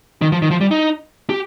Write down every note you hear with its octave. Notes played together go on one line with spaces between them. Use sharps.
D#3
F3
D#3
F3
G3
D#4
G4